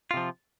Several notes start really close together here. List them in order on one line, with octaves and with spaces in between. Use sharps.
F4 C3 F3